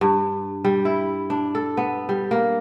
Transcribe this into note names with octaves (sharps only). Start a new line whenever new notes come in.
G2
G3
E4
D4
A4
B3
G3
A#3